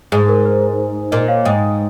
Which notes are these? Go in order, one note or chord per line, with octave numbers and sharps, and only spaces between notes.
G#2 G#4
A#4
C5
A#2 C5 D#5
C#5 F5
G#2 D#5 G5